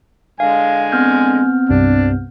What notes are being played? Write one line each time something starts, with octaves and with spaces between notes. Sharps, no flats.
D3 G#3 F5 G#5
B3 C4 F6 G6
C2 G2 C3 D4